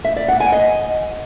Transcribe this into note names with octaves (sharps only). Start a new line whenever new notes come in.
E5
D5
F#5
G#5
D#5